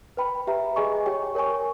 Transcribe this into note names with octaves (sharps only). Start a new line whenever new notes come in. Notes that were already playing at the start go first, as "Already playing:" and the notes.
B4 G5 B5
G4 B4 E5 A#5
G#4 D#5 G#5 C#6
G4 C#5 G5 C#6
A#4 C#5 G#5 C#6